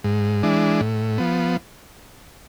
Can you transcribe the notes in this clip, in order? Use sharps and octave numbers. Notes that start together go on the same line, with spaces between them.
G#2
E3 G#3 D4
A2
F3 B3